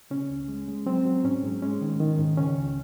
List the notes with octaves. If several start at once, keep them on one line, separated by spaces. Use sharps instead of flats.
C#3 C#4
C#2
G#3
G#3
F#3 C4
F#3
G#2 C#4
G#2
G#3 C#4
D#3
D#3
G#2
C#3 C#4
C#2